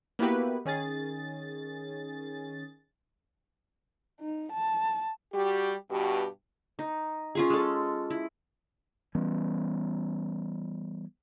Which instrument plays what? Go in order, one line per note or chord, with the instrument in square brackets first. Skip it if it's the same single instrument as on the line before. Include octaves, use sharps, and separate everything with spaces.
[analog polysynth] A#3 B3 E4 F#4 G4 B4
D#3 C#4 G#4 A6
[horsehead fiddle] D#4
A5
[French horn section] G3 F#4 G4
G2 B2 F#4 G4
[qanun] D#4
C#4 F4 G#4
G#3 A4
E4
[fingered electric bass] E3 G3 B3 C#4